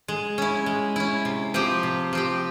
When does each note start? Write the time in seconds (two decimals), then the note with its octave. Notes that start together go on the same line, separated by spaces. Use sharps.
0.08 G#3
0.38 C#4 E4
0.66 G#3
0.96 C#4 E4
1.25 C3
1.54 F3 C4 G4
1.83 C3
2.13 F3 C4 G4